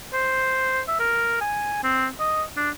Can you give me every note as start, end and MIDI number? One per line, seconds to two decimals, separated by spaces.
0.13 0.82 72
0.88 0.97 76
1.00 1.40 70
1.41 1.81 80
1.83 2.08 60
2.19 2.43 75
2.56 2.70 62